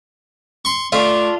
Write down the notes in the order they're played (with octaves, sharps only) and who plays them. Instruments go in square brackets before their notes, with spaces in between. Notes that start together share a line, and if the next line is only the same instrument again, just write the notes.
[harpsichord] C6 C#6
[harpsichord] A3 [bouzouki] D4 F4